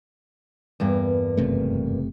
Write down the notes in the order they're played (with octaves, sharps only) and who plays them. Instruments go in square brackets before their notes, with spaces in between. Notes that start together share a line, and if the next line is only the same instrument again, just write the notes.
[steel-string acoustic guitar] E2 G2 A#3
[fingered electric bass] F#1 C3 A3